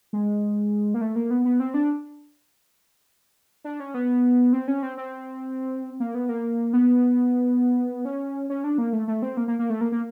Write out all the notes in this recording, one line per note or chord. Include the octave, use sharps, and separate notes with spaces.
G#3
A#3
A3
A#3
B3
B3
C4
D4
D4
C#4
B3
C4
C#4
C4
C4
A#3
B3
A#3
B3
C#4
C#4
D4
A#3
A3
A3
C4
A#3
A#3
A#3
A3
A#3
A#3